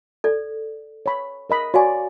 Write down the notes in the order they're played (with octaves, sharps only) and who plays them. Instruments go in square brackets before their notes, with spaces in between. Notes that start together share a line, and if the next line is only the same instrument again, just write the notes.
[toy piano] A4 D5
[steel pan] C#5 B5
A#4 D#5 B5
[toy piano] F#4 F5 G#5 [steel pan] C#5 D5